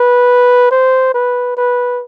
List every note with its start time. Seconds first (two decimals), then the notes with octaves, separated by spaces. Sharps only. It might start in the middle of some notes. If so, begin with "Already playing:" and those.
Already playing: B4
0.71 C5
1.14 B4
1.57 B4